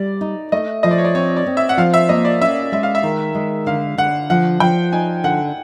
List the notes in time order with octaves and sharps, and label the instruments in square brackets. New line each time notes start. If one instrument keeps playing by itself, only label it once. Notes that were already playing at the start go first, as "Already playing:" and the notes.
Already playing: [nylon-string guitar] G3 [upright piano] D5
[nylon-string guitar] D#4
[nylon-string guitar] A3 [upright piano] D#5
[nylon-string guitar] F3 [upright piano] D#5
[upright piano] D5
C#5
D5
[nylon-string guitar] C4 [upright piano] C#5
[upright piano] D5
[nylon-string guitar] C4
[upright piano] E5
F#5
[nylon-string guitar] F3 [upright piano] F5
[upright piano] E5
[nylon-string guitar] A#3 [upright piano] D#5
[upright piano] D5
[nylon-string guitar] C#4 [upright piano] E5
[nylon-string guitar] G#3 [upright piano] E5
[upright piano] F5
E5
[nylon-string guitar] D#3
G#3
[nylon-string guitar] D3 [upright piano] F5
[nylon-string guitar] D3 [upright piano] F#5
[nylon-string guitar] F3 [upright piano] F#5
[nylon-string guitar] F3 [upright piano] G5
[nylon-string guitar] D#4 [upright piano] G#5
[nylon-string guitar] D3 [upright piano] F#5